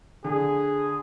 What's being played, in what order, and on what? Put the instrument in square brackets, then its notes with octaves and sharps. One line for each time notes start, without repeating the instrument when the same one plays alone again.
[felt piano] D3 [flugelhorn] G#4